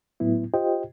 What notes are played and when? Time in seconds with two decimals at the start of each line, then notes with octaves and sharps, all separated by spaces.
0.20 A2 F#3 B3 E4
0.54 F4 G4 C5 D#5 G5